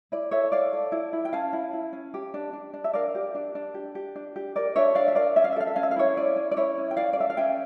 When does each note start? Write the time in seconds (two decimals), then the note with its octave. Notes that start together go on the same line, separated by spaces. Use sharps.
0.12 E4 D5
0.31 A4 C#5 E5
0.52 A4 D5 F5
0.73 A4
0.92 E4
1.13 E4
1.25 G5
1.33 C#4 F5 A5
1.53 E4
1.73 E4
1.93 C#4
2.14 G4
2.34 D4
2.53 D4
2.74 D4
2.84 E5
2.93 A#4 D5 F5
3.15 G4
3.35 D4
3.55 D4
3.74 G4
3.95 G4
4.16 D4
4.36 G4
4.56 A#4 D5
4.76 D4 C#5 E5
4.95 D4 D5 F5
5.08 E5
5.15 A#4 D5 F5
5.36 C#4 E5
5.44 F5
5.52 E5
5.56 A4 F5
5.67 E5
5.76 C#4 F5
5.83 E5
5.91 F5
5.96 E4 C#5 E5
6.17 C#4 D5
6.36 C#4
6.51 D5
6.57 E4 C#5 E5
6.78 C#4
6.91 G5
6.97 C#4 D5 F5
7.13 D5
7.17 A4 E5
7.30 F5
7.37 C#4 E5 G5